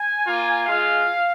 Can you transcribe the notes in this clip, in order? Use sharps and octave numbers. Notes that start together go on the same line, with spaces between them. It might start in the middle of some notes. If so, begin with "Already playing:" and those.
Already playing: G#5
A#3 F4
G#3 F4 F5